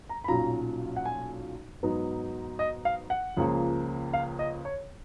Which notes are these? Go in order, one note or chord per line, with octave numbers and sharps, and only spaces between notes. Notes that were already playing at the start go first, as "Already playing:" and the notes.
A#5
B5
B1 A#2 F#3 C#4 F4 A#5
F#5
G#5
G#2 F#3 B3 D#4
D#5
F5
F#5
C#2 C#3 F3 A#3 F4
F5
D#5
C#5